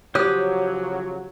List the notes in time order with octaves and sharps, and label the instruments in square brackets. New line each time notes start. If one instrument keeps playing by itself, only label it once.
[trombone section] C#3 F3 F#3 [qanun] G4 [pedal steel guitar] C5 D#6 F#6 [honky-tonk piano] C#5